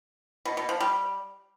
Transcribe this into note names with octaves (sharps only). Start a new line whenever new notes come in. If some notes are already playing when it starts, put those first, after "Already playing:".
B2
B2
F3
G3